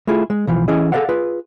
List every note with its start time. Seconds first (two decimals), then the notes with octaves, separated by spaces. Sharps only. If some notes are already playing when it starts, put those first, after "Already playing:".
0.07 A3 E4 F4 G#4
0.30 G#3
0.47 B1 E3 F3
0.68 E3 C#4 E4 G#4 D#5
0.92 G#4 A4 C5 D5 F5 F#5
1.09 F4 G#4 B4